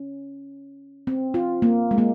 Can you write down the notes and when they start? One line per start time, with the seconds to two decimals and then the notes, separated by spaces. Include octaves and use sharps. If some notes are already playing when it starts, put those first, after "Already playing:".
Already playing: C#4
1.07 C4
1.34 F4
1.62 A#3
1.91 G#3
1.98 A#3